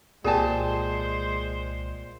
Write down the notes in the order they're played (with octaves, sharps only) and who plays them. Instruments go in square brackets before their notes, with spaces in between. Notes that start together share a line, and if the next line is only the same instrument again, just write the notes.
[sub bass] C2 [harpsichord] A#2 G4 [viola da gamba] G#3 C5 [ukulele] G#4 G#5 A5